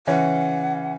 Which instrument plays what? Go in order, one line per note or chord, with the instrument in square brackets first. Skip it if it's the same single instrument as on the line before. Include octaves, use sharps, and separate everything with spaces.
[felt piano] C#3 E3 C#4 [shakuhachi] F#5